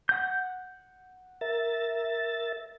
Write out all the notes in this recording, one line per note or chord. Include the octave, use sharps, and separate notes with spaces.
F#5 G6
A#4 E5 A6